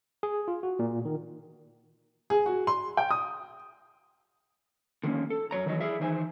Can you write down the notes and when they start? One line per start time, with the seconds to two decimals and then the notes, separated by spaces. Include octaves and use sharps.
0.23 G#4
0.48 F4
0.63 F#4
0.79 A#2
1.05 D#3
2.30 G#4
2.46 F#4
2.67 C6
2.97 G5
3.11 D#6
5.04 D3 D#3 F3 A#3 B3 C#4
5.30 A4
5.51 F#2 F#3 C#5 A#5
5.66 D#3 E3 F#3 C#5 D#5
5.81 E4 G#4 D5 E5
6.00 D#3 E3 D#4 C5 G#5